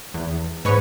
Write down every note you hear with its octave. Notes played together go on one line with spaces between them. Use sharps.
E2
G#2 B4 C#5 C#6